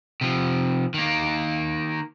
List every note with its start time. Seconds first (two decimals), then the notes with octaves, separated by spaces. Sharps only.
0.21 C3 F3
0.94 D#3 A#3